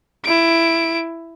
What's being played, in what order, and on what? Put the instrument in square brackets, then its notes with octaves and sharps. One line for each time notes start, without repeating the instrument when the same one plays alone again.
[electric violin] E4 D7